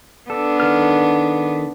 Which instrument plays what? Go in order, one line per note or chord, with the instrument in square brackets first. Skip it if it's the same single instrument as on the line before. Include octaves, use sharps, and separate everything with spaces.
[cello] B3 D4 [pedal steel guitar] A4
[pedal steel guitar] D#3 A4 F6